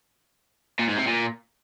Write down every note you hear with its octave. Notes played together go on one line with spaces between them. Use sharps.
A#2
G#2
C3
A#2